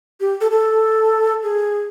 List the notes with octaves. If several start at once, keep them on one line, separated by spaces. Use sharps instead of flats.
G4
A4
A4
G#4